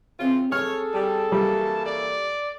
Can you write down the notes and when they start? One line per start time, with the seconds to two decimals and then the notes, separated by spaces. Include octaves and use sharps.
0.20 C#3 E3 C4 F4
0.52 G#4 A4 C#5 F6
0.94 G3 A5
1.32 E3 G3 A#3 C#4
1.86 D5